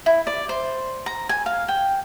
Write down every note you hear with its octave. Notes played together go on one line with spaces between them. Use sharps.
E4
D5
C5
A#5
G#5
F5
G5